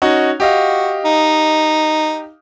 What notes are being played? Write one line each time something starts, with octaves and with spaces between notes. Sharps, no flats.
C#4 D#4 F#4
F#4 G4 D#5 F5
D#4